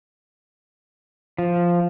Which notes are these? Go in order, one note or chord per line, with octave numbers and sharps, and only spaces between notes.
F3